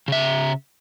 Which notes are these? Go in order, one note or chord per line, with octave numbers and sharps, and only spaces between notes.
C#3 E5